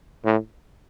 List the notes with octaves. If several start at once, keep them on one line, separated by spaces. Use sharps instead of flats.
A2